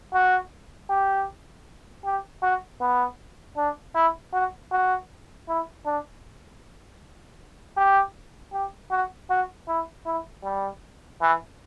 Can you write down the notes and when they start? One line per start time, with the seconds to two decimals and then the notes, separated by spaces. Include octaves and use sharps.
0.13 F#4
0.90 G4
2.05 G4
2.43 F#4
2.81 B3
3.57 D4
3.95 E4
4.33 F#4
4.72 F#4
5.48 E4
5.86 D4
7.77 G4
8.53 G4
8.91 F#4
9.30 F#4
9.68 E4
10.06 E4
10.44 G3
11.21 E3